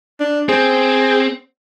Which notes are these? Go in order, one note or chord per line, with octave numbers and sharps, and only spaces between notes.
D4
C4 G#4